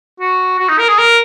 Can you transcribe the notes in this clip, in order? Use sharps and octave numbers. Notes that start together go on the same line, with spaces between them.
F#4
F#4
D#4
A#4
G#4
A#4